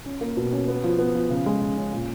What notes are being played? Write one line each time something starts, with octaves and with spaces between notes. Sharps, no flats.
C#4
A#3
B2
C#4
B3
F3
B3
F3
C#3
G#3
C#3
C#4
A#2